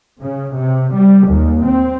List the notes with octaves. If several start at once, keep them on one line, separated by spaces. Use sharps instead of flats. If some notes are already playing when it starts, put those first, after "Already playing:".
C#3
C3
G3
D#2
C4